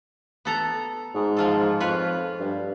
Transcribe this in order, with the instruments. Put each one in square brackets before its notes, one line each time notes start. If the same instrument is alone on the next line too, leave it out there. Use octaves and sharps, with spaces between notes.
[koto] B3 A4 A#5
[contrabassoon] G#2
[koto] F3 F4 A4
[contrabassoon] F2 [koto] F4 B4 C#5
[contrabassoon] G2